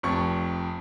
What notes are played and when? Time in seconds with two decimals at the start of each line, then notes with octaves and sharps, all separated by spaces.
0.03 F1 F2 C#6